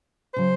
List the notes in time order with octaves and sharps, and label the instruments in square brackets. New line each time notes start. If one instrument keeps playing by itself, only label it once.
[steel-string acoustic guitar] C#3 F#3 [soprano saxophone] C5